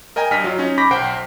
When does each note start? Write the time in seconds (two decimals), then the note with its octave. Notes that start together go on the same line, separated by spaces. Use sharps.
0.16 A#4 D#5 G5 G#5 A#5
0.31 G2 D#5 F6 B6
0.44 F#3 F4
0.58 C#4 D#4
0.78 B5 C#6 D6 G6 A#6 B6
0.91 B1 C5 F#5 G5 D7